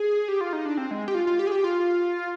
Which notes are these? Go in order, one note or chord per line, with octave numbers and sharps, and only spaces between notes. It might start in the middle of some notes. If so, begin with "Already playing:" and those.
Already playing: G#4
G4
F4
D#4
D4
C4
G#3
G4
F4
F4
G4
G#4
G4
F4